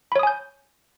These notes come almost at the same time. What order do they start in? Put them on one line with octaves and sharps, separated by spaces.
B5 C#5 D#6 G#5 G6